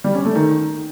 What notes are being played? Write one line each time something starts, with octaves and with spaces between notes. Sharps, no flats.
G3
C#4
A3
D#3